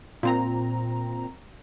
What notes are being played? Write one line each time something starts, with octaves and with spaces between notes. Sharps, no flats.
A#2 C4 A#5